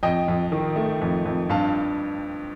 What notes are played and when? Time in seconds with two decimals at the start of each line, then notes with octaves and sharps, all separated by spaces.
0.03 F2 D#5 G5
0.28 F2
0.52 D#3
0.76 A3
1.02 F2
1.25 F2
1.49 G2 F5 A5